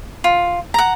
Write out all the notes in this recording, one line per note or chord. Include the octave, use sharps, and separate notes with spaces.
F4
F#5 A#5